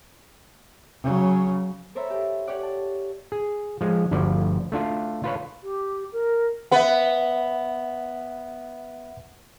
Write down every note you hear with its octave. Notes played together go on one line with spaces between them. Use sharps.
C#3 F#3
A4 A#4 C5 C#5 E5 B5
G4 A4
G4 C#5 D5 F#5
A5
G#4
F3 G#3
G1 D2 F3 D5
A3 D4 F4
F4 B4 C#5
G4
A#4
B3 B4 E5 F#5